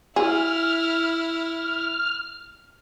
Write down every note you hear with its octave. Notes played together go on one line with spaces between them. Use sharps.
E4 G#4 F6